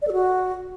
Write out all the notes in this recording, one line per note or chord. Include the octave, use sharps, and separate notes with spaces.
D5
A4
F#4